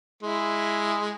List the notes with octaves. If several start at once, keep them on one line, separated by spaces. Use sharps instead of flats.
G#3 E4